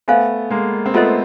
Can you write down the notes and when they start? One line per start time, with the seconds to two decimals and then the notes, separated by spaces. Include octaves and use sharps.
0.08 A3 B3 C5 F5 G#5
0.50 G#3 A#3
0.86 C4
0.94 A3 B3 F4 A4 C5 D#5